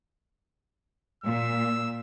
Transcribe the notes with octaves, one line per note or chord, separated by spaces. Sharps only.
A#2 E6